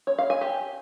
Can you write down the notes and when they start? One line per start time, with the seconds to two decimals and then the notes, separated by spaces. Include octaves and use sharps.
0.07 C#5
0.19 F5
0.30 G#5
0.41 G4